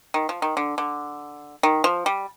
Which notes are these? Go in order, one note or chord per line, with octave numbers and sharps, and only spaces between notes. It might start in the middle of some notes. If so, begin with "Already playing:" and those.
D#3
F3
D#3
D3
D3
D#3
F3
G3